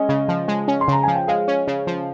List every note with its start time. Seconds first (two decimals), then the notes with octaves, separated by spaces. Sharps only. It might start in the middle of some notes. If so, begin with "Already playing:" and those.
Already playing: G#3 C#4 D#5
0.09 C#3
0.29 F3
0.48 G#3
0.68 C#4
0.81 C6
0.88 C#3 A#5
1.03 F3 G#5
1.16 G5
1.28 G#3 F5
1.48 C#4
1.68 C#3
1.87 F3